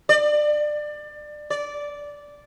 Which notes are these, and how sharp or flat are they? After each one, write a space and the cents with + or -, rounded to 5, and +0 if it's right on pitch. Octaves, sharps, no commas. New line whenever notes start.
D5 +25
D5 -10